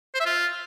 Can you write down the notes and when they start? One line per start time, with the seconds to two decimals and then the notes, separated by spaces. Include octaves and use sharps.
0.15 C5
0.20 E5
0.26 F4